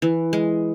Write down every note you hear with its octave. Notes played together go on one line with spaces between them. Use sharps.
E3
G#3